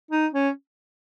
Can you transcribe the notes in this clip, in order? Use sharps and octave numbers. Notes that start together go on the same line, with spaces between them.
D#4
C#4